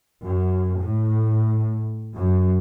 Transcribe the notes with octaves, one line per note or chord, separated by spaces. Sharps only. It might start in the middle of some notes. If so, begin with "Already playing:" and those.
F#2
A2
F#2